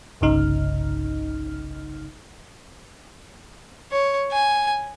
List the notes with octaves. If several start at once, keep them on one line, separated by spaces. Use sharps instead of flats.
G1 C2 G2 C#3 D#4 F6
C#5
G#5